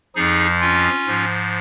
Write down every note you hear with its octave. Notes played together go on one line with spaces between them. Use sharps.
F2 F3 D#4 G#4
C#4 F4
G#2 F3